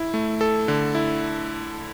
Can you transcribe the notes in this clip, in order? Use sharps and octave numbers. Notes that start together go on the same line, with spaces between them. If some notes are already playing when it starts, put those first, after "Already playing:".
Already playing: E4
A3
A4
D3
E4